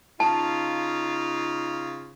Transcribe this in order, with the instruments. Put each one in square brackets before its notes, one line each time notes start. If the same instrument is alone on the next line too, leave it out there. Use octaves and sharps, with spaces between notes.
[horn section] C#3 D#4 F4 [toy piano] A5